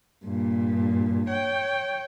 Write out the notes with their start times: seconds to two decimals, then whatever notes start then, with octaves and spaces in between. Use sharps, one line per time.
0.24 G2 A#2
1.30 C#5 G5